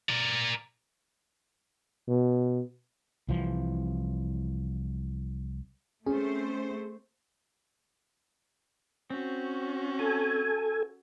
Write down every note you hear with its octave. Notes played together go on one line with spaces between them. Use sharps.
A#4 D5
B2
C2 E3 F3
A3 C4 C#4 G#4 C5
C4 C#4 F#4
A4 G#5